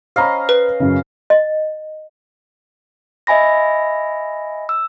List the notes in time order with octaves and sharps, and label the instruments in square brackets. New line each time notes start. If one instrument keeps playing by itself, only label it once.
[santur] C#4 D#5 F5 [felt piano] C5 A#5 B5
[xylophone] B4
[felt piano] F#2 C#3
[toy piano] D#5
[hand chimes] D#5 E5 G#5 B5 A#6
E6